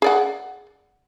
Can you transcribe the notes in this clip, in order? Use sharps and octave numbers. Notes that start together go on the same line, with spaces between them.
G#4 D5 F#5